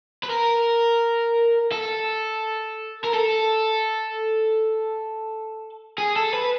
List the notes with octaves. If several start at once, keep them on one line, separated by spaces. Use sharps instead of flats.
B4
A#4
A4
A#4
A4
G#4
A4
B4